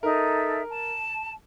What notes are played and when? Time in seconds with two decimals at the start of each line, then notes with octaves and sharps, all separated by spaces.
0.03 D#4 A4 A#4 E5
0.70 A5